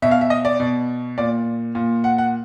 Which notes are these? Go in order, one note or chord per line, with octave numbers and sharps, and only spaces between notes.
B2 E5
F5
E5
D#5
D5
B2
A#2 D5
A#2
F#5
F#5